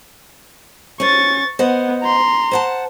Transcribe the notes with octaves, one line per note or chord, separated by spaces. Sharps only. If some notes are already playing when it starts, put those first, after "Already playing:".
C#4 C5 C#6 A6
B3 C5 D#5 F#5
A#5 C6
C5 F#5 A5